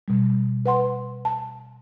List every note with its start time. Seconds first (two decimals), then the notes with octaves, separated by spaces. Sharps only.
0.08 B2 G3
0.66 B4 F#5 C6
1.25 A5